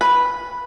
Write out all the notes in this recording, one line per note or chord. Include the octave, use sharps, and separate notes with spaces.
B4